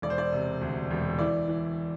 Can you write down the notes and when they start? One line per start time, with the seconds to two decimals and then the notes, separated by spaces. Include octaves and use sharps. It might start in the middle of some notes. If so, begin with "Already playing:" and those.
0.02 E1 D5
0.10 C5
0.18 D5
0.32 C3
0.61 D2
0.91 E1
1.19 E3 D5
1.48 E3